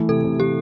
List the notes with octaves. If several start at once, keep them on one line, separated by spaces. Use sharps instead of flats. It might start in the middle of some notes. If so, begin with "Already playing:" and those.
Already playing: E3 A3
C3 A4
C3
E3 G4